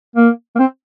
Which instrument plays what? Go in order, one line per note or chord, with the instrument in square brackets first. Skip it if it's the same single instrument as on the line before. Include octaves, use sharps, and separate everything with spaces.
[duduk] A#3
A#3
C4